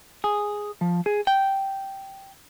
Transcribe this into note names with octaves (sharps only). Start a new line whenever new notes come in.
G#4
F3
G#4
G5